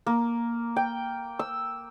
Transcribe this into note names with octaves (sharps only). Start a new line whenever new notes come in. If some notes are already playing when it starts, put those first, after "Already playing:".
A#3
G5
E6